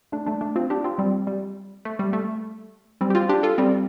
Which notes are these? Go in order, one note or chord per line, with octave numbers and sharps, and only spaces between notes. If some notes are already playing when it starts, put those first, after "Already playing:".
A3 D4
A3 D4
A3 D4
C4 F4
D4 G4
C4 F4
G3 C4
G3
A3
G3
A3
G3 C4
G4
C4 F4
D4 G4
F4 A4
G3 C4